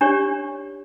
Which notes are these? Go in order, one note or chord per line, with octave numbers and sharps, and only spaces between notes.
D4 G4 C#5 D5